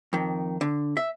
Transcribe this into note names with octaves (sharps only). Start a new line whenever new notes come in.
F2 D#3
D3
E5